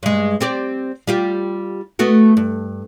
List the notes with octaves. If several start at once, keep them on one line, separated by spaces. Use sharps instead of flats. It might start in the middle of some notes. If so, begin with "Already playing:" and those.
G2 G#3
C4 G4 D5
G3 F4 G4
A3 B3 F#4
G2